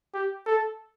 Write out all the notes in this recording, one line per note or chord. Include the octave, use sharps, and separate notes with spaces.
G4
A4